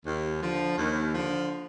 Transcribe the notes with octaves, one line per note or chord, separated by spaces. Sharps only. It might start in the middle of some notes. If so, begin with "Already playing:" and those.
D#2
D3 F3
D#2
D3 F3